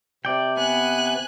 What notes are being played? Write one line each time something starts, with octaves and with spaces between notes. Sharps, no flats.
C3 D5 G5
B3 G#5 F#6